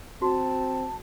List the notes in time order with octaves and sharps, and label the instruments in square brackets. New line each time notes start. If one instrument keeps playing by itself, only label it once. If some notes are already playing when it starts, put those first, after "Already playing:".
[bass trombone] C4 [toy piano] F#4 [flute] A5